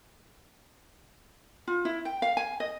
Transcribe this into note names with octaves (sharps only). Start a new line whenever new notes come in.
F4
E4
G5
F5
G#5
D#5